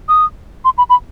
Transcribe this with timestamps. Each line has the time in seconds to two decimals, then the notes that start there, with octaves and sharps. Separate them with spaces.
0.09 D#6
0.65 C6
0.78 B5
0.90 B5